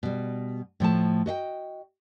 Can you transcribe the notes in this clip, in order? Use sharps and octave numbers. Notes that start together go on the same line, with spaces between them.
B2 G3
A2 F3 A3 A5
F#4 D#5 F5 G5